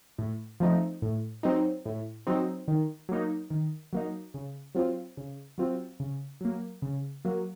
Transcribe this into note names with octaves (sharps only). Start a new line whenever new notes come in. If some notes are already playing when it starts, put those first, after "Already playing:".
A2
F3 A3 C4 D#4
A2
F#3 C4 D#4
A2
F#3 C4 D#4
D#3
F#3 A#3 D#4
D#3
F#3 A#3 D#4
C#3
F#3 C4 F4
C#3
F#3 C4 F4
C#3
F#3 A#3
C#3
F#3 A#3